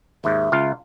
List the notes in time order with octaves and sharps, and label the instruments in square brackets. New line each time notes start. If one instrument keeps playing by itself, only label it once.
[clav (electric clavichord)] D#2 G#2 [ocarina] E5
[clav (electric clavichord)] C#2 F4 F5